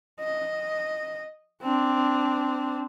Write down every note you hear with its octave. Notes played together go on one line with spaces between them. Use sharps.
D#5
C4 D4